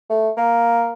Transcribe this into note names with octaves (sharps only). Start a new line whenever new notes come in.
A3
A#3